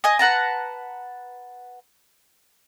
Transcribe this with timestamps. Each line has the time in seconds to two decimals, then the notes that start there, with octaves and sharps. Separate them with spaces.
0.04 D#5 G#5 D#6
0.19 B4 F#5 A5 A#5